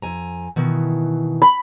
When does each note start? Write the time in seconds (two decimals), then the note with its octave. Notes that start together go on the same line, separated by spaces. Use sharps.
0.02 F2 G#5 A#5
0.56 B2 D#3 E3
1.42 B5